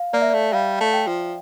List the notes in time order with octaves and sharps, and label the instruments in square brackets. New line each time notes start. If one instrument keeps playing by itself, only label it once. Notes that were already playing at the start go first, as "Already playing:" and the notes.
Already playing: [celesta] F5
[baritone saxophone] A#3 [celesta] D5
[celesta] E5
[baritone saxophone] A3 [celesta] D5
[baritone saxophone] G3 [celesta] F5
[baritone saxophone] A3
[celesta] G5
[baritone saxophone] F3